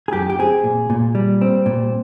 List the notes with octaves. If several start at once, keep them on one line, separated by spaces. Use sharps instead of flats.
G#4
F#2 G4
G4
C4 G#4
A#2
A#2
G3
C4
A#2